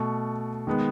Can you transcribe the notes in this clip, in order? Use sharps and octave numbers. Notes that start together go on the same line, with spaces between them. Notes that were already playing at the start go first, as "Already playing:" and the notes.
Already playing: B2 A3 C#6
D#3 G#3 B3